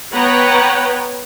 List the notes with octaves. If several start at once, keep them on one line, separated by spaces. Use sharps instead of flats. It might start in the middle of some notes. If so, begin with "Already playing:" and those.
B3 B4 C#5 F#5 G5 A#5